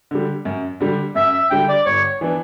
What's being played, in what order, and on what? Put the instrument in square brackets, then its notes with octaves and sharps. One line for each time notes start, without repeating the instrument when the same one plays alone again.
[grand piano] D3 G3
F#2
D3 G3
[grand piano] F#2 [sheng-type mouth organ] E5
[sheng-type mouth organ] E5
[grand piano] D3 G3 [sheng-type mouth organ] G5
[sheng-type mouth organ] D5
[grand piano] G1 [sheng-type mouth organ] C#5
[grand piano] E3 B3 D4